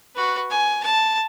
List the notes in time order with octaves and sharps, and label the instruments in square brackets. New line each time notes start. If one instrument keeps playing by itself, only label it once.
[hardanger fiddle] F#4 B4
G#5
A5